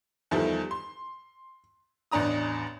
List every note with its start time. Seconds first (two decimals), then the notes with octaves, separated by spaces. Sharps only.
0.31 E2 D#3 F3 G3 E4 A4
0.71 C6
2.11 A1 E2 D4 A#5 D#6